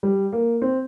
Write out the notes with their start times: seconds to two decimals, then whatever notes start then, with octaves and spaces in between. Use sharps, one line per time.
0.03 G3
0.33 A#3
0.62 C4